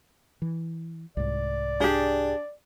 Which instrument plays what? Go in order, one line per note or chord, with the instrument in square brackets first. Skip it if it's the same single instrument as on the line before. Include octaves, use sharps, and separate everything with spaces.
[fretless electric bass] E3
[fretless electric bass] C2 G#2 [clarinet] D5
[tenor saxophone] D4 [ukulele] G4 G#4